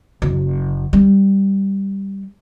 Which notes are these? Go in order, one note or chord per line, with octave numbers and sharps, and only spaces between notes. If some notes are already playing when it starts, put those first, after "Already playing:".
F#1
G3